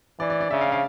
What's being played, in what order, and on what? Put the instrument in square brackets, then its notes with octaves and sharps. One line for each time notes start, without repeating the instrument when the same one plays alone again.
[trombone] E3 [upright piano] D5
[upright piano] D5
D5
[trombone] C#3 [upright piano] E5
[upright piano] F5
F5